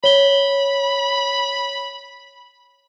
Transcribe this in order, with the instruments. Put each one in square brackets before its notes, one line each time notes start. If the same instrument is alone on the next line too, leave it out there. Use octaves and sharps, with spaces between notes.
[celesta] C#5 G7 [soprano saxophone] B5